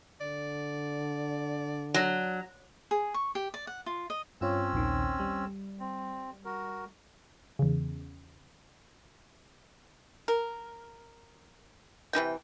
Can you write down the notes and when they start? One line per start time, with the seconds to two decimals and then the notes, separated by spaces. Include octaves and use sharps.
0.20 D3 D5
1.94 F#3 D4
2.91 G#4
3.14 C#6
3.35 G4
3.54 D5
3.67 F#5
3.86 F4
4.10 D#5
4.41 G2 C4 C#4 F4 C#5 E6
4.73 A#1 D#2 D#3
5.20 G3
5.80 C4
6.45 F#4 A#4
7.59 E2 C#3
10.28 A#4
12.13 C3 E3 D#4 G5